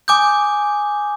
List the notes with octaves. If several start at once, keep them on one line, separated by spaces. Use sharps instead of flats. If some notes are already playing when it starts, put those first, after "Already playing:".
G#5 D6 D#6 G6